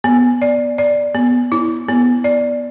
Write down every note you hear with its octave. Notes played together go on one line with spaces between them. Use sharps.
B3
D5
D5
B3
E4
B3
D5